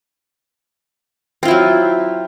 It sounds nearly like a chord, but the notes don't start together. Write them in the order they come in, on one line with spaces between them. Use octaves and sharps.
C4 F4 E4 F#3